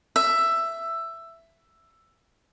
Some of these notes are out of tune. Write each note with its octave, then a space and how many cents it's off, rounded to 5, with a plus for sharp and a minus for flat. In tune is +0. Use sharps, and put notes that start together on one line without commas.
E5 +10